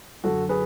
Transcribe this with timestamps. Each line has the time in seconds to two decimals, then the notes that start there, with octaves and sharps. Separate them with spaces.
0.24 F#2 D3 F#4 A4
0.49 G#4 B4